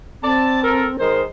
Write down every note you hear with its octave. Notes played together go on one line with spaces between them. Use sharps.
C4 D5 A5
A4 A#4
D#3 G#3 A#4 C5